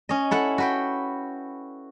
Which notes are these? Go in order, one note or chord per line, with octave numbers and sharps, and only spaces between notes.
C#4 D#5
E4 A4 F#5
F#4 B4 G5